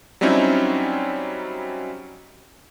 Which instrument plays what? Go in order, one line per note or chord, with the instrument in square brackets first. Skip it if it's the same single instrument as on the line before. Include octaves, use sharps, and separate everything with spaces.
[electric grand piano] F#3 G3 C4 C#4 D#4 E4